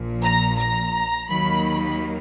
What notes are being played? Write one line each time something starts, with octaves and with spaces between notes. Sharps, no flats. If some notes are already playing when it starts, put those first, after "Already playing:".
Already playing: A#1 A#2 F3
A#5
A#5
D#2 D#3 F#3 A#3 B5